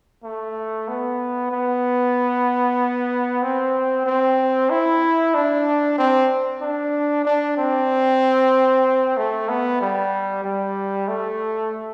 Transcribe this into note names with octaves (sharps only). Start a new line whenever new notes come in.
A3
B3
B3
C4
C4
E4
D4
C4
D4
D4
C4
A3
B3
G3
G3
A3